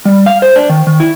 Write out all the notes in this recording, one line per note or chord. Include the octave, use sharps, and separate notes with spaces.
G3
F5
C5
D4
D#3
D#3
E4